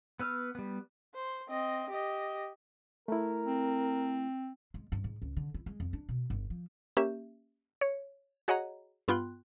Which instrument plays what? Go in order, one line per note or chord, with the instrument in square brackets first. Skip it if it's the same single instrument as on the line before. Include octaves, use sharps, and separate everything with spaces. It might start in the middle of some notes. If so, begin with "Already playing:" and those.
[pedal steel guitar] B3 B4 E6 F6
G3 B3
[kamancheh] C5
C4 D#5
G4 D#5
[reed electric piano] A3 E4 [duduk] A#4
[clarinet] C4
[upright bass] G#3
G2
G#2
C#2
D3
E4
G#3
F2
D4
B2
G1
F3
[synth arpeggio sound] A#3 C#4 G4 E5
C#5
F#4 G#4 C#5 D#5 F#5 A#5
G2 B3 F4 G5 C6 F#6